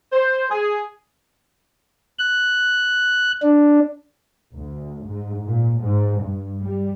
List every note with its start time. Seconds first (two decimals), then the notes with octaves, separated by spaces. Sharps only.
0.13 C5
0.51 G#4
2.19 F#6
3.42 D4
4.54 D2
5.08 G#2
5.46 A#2
5.81 G#2
6.21 G2
6.63 G3